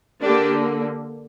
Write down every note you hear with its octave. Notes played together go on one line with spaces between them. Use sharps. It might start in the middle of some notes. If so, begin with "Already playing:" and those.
D3 A#3 D4 G4